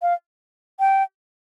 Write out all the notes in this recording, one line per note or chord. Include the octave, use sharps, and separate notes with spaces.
F5
G5